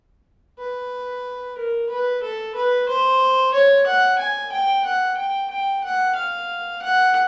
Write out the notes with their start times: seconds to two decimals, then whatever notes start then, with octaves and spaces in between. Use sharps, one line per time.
0.59 B4
1.58 A#4
1.90 B4
2.23 A4
2.55 B4
2.89 C5
3.54 C#5
3.87 F#5
4.19 G#5
4.52 G5
4.85 F#5
5.17 G5
5.50 G5
5.84 F#5
6.15 F5
6.82 F#5